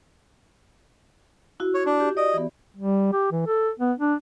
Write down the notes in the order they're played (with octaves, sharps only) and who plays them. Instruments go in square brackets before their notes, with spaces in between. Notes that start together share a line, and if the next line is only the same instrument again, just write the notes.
[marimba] E4 F#4
[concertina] C#5
D4
[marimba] G4
[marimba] D5 [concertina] D#5
[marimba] E3 B3
[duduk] G3
G4
E3
A4
B3
D4